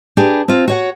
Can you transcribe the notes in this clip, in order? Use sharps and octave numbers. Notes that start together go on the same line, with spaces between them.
D4 G4 G#4 B4
C4 F4
F#4 C#5 F#5